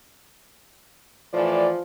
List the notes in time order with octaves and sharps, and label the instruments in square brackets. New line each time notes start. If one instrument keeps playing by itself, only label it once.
[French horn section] A2 E3 D5 [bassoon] F3